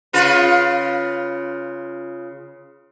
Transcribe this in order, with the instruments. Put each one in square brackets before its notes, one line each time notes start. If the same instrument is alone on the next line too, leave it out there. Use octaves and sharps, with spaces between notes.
[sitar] C#3 F4 B4